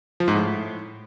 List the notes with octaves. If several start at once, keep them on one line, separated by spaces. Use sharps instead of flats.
F3
G#2
A2